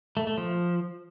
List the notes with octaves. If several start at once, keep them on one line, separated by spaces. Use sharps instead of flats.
A3
A3
F3